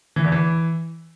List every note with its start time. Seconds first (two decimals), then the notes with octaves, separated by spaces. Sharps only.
0.16 E3
0.24 E2
0.32 E3